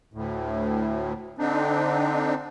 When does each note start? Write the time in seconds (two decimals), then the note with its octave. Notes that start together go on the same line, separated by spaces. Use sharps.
0.13 D2 A2
1.38 D3 C4 D4 D#4